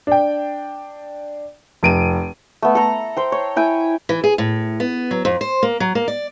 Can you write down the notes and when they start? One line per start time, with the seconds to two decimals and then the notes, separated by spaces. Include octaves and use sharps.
0.07 D4 G5
1.83 F1 D7 D#7
2.62 A3 B3
2.75 A4 A#5
3.17 C5 G5
3.32 C#5
3.56 E4 G5 G#5
4.09 E3
4.24 G#4
4.38 A2
4.80 B3
5.11 F#3
5.25 F2
5.41 C5
5.63 A#3
5.80 F#3
5.95 A#3
6.08 D5